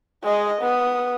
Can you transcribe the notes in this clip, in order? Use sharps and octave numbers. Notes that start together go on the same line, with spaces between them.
G#3 D#5
B3 D#6